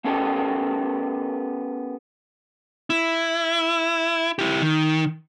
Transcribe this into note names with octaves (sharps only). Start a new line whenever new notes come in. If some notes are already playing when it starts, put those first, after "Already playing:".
A3 B3 C#4 G4 A4 A#4
E4
E4 G4
D#3